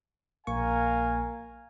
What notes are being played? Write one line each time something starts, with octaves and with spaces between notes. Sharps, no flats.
A#1 A#3 A#4 F5 G#5 C#6